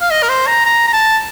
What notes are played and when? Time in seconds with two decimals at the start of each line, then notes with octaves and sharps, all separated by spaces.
0.01 F5
0.11 D#5
0.23 A#4
0.29 C5
0.47 A#5
0.66 A#5
0.88 A#5
0.93 A5